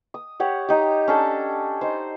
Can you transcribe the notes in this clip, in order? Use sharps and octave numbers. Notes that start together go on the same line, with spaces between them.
D#6
G4 C#5 F#5
D#4 G4
C#4 D4 A4 A5
D#4 C5